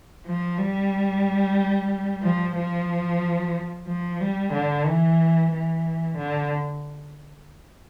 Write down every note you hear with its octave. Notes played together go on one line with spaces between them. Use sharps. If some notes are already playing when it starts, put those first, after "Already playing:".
F3
G3
F3
F3
F3
G3
D3
E3
E3
D3